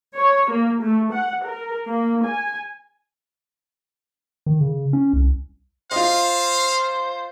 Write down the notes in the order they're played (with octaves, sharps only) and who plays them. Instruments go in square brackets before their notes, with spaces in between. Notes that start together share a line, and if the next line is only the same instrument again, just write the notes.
[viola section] C#5
A#3
A3
F#5
A#4
A#3
G#5
[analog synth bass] D#3
C#3
C#4
C2
[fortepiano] F4 D#5 [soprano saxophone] C5 [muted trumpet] F5